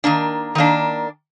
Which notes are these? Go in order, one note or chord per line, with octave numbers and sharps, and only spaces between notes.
D#3 A#3 D4
D#3 A#3 D4